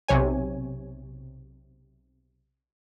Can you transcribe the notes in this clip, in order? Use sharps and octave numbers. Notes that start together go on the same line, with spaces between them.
B1 C3 C#5 G#5